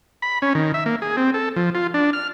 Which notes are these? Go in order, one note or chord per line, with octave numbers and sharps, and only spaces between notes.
B5
C#4
D#3
E5
A#3
G#4
C4
A4
F3
F4
D4
F6